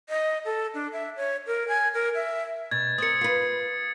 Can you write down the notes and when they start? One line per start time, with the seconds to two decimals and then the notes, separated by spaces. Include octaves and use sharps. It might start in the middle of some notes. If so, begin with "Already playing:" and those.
0.09 D#5
0.45 A4
0.74 D4
0.93 E5
1.17 C#5
1.47 A#4
1.68 G#5
1.94 A#4
2.14 E5
2.71 B2 G#6 A6
2.98 C4 A#4 D#6 C#7
3.21 F4 B4 C7